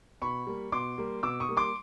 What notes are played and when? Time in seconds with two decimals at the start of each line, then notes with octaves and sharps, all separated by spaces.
0.22 B2 B5 C#6
0.47 G3 A#3
0.72 B2 C6 D6
0.98 G3 A#3
1.23 B2 D6 E6
1.40 C#6 D#6
1.49 G3 A#3
1.57 C6 D6